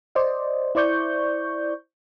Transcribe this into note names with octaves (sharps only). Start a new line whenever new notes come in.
C5 D5 D#5
E4 C5 D5 C#6 G6